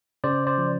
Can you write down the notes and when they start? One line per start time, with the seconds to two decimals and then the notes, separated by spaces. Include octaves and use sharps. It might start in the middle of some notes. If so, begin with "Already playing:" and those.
0.24 C#3 C5 D5
0.47 C5 D5
0.58 F3